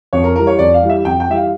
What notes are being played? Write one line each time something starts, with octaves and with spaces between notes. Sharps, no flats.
F2 C#5
A#4
E3 G3 A#4
C#5
F2 D5
F5
E3 G3
E5
F2 G5
G5
E3 G3 E5
F5